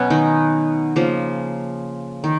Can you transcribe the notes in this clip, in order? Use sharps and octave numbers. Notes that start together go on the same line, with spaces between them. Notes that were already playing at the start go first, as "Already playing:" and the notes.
Already playing: B2 F#3 B3 C#4
D#3 D#4
C#3 F3 A#3
D#3